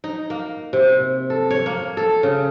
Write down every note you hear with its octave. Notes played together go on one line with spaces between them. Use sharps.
D#4
A#3
C3
A4
C#5
A#3
A4
C#3